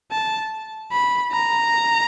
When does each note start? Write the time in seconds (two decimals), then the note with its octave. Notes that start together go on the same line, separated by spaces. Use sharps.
0.12 A5
0.92 B5
1.33 A#5